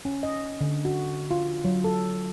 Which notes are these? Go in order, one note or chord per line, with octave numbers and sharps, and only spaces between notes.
C#4
D#5
D3
F#4
F4
F#3
A4